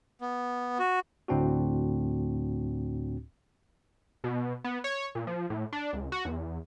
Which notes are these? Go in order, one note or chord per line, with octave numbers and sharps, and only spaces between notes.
B3
F#4
D2 A2 C4 D4 F#4
B2
B3
C#5
A#2
F3
A2
D4
C#2
F#4
E2